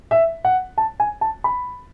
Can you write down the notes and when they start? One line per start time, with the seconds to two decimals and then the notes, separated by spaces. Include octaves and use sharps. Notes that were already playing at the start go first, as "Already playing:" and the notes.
0.11 E5
0.45 F#5
0.78 A5
1.00 G#5
1.21 A5
1.44 B5